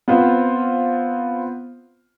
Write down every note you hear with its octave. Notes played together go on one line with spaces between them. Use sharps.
B3 C4 F4 C5